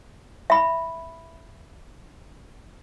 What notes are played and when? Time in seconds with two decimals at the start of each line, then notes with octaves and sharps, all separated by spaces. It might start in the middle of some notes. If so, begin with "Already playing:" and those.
0.50 E5 B5